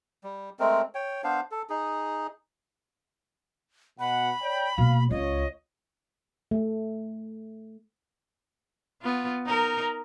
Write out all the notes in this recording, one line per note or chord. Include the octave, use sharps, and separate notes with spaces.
G3
G#3 A3 C4 A#4
C#5 G5
B3 D4 C5 F5
A4
D#4 G#4
B2 F#5 B5
C#5 D5 G5
B2 A#3 F5
C#2 F4 C#5 D#5
A3
B3 F4
D#4 A#4